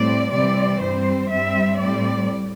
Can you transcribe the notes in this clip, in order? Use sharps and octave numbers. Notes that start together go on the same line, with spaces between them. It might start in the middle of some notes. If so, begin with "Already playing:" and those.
Already playing: A2 G3 C4 D5
C3 E3 G3 C4 D5
G2 G3 C4 C5
G2 G3 C4 E5
A2 G3 C4 D5